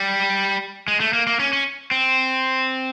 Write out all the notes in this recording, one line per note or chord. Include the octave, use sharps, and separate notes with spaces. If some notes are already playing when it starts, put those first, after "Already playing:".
Already playing: G3
G#3
A3
A#3
A#3
C#4
C#4
C4